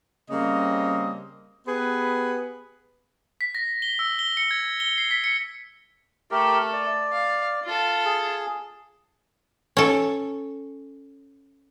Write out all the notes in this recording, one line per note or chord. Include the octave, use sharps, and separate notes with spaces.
C#3 G3 A#3 C4 D#5
B3 G4 G#4 B4
B6
A#6
G7
E6
G7
C#7
G#6
G7
C7
B6
C#7
A3 G4 A4 A#4
D5
F5
F4 A4
G#4
C#4 A4